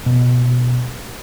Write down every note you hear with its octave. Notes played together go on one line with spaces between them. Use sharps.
B2